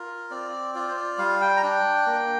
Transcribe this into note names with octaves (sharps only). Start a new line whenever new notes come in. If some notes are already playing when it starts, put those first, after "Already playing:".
Already playing: F4 A#4
C4 D5
F4 D5
C5
D5
G3 F5
G5
A#5
D4 G5
A#3